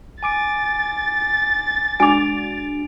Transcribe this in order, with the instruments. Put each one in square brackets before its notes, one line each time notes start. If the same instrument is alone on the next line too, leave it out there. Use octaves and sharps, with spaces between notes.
[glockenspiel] G#5 D6 D7 [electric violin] A6
[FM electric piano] G#3 D4 F#4 [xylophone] G#5 D6 [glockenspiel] D7 F7